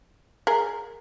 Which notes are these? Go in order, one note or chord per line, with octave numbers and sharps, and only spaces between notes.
G#4 A#4